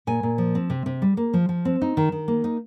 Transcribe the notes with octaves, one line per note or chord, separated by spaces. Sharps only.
A#2 G#5
A#2
F3
C4
C3
C3
G3
A#3
F3
F3
C4
D#4
D#3
D#3
A#3
D#4